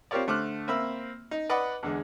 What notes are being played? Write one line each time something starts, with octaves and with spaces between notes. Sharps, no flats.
C4 F4 G4 A#4 C#5 D5
D3 A3 C5 D6 F6 F#6
A#3 C4 E5 B5 E6
D#4
B4 D5 D#5 F#5 B5
E2 D3 G#3